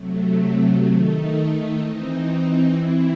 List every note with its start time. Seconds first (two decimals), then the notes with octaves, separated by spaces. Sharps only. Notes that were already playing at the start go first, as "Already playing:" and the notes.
Already playing: C3 F#3 A3
0.86 D#3 A3 D#4
1.78 E3 C4 D#4
2.71 E3 C4 E4